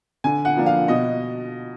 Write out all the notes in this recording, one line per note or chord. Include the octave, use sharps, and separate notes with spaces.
D3 G#5
F#5
F3 A#3 D4
F5
B2 D#5